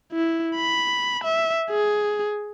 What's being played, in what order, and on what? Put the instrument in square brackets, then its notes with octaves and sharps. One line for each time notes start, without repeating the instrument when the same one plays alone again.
[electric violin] E4
B5
E5
G#4